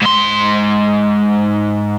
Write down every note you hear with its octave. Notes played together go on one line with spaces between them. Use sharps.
G#2 C6